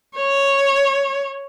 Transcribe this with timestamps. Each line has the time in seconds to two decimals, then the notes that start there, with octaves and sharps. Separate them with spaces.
0.16 C#5